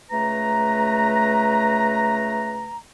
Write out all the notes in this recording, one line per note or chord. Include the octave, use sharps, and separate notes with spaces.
C#2 A3 B4 A#5